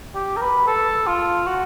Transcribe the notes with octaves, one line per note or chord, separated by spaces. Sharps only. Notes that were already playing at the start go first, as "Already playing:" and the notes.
G4
A#4
B4
A4
F4
F#4